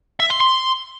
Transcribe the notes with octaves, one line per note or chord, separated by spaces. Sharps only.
E5
C6
C6